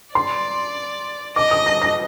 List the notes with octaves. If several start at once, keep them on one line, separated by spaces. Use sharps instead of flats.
D5 C6
D#5 D6
D#6
A#6
A#6